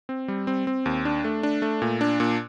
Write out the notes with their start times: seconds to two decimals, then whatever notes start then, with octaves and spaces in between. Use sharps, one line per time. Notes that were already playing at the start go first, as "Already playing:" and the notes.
0.09 C4
0.28 G3
0.47 C4
0.67 C4
0.86 D#2
1.05 D4
1.24 A3
1.43 D4
1.62 A3
1.82 A#2
2.01 D4
2.20 A#2